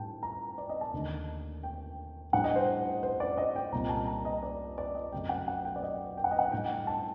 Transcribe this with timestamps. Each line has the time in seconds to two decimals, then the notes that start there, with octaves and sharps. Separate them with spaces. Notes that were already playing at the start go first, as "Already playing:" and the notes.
Already playing: A2 G3 D#4 G5 A5
0.23 A#5
0.58 D5
0.69 D#5
0.81 A5
0.93 D#2 D3 A3 D4
1.63 G5
2.33 A2 G3 D4 F#5
2.44 D#5
2.56 C5
3.03 C5
3.20 D5
3.38 D#5
3.56 G5
3.72 C2 A#2 G3 C4 A#5
3.89 A5
4.07 A#5
4.25 D#5
4.43 D5
4.78 D5
4.95 D#5
5.12 F#2 F#3 A3 C4 G5
5.29 F#5
5.48 F#5
5.65 G5
5.76 D5
5.83 D#5
6.17 G5
6.24 F#5
6.31 D#5
6.39 F#5
6.52 A2 G3 D4 G5
6.87 A5